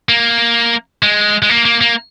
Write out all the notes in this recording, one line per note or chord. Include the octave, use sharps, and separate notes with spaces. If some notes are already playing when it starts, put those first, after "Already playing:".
A#3
G#3
G#3
A#3
A#3
A#3